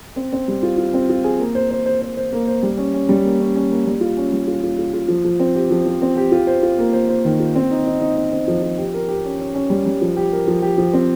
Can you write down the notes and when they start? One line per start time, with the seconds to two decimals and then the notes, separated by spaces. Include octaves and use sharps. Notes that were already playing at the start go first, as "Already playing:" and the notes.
0.16 C4
0.33 C4
0.48 G3
0.63 F4
0.78 F4
0.94 C4
1.09 F4
1.24 G#4
1.39 A#3
1.55 C5
1.71 C5
1.86 C5
2.01 C5
2.17 C5
2.33 A#3
2.47 C5
2.63 G3
2.78 C#4
2.94 C#4
3.09 G3
3.24 A#3
3.40 C#4
3.56 C#4
3.70 A#3
3.86 G3
4.01 F4
4.17 C#4
4.32 G3
4.47 F4
4.63 F4
4.78 F4
4.93 F4
5.08 F3
5.24 F3
5.40 C4
5.55 G4
5.71 F3
5.86 F3
6.02 C4
6.17 G4
6.32 F4
6.47 C5
6.63 F4
6.78 A#3
6.93 C5
7.09 C5
7.25 D#3
7.40 F4
7.56 C4
7.71 D#4
7.86 D#4
8.01 D#4
8.16 D#4
8.32 C4
8.48 F3
8.63 F3
8.78 G4
8.94 A#4
9.08 G4
9.24 C#4
9.40 C#4
9.54 C#4
9.70 G3
9.86 G3
10.02 F3
10.17 G4
10.32 A#4
10.48 F3
10.62 G4
10.78 F3
10.93 C4